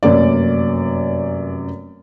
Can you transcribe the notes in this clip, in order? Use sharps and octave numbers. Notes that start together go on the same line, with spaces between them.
F1 F#2 A#3 C#4 D5